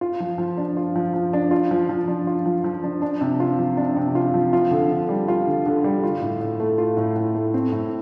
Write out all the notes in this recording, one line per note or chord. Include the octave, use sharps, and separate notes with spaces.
F4
F3
F3
D4
F4
F3
F3
D4
F4
F3
F3
D4
F4
F3
F3
D4
D4
C3
F4
F3
D4
C3
F4
F3
F4
D3
D3
G3
F4
D3
D3
G3
F4
A2
A2
A3
F4
A2
A2
A3
C4
A2